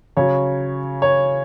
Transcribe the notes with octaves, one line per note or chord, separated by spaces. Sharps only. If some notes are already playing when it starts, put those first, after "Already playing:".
C#3 F#3 C#5
C#5